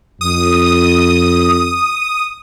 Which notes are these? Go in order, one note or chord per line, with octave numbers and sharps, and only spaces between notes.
F2 D#6